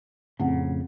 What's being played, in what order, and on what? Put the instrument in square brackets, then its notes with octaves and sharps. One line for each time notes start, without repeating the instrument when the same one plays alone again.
[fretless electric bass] F2 A2 C#3 [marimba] C4 F#5